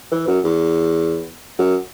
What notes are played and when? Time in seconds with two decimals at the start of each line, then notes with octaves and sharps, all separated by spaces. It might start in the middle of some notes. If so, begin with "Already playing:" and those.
0.11 E3
0.28 F#2
0.44 E2
1.59 F#2